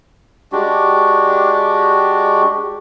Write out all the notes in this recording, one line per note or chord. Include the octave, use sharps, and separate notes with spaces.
G#3 D4 F#4 G4